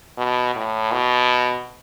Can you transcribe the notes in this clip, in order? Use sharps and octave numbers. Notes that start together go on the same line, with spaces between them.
B2
A2
B2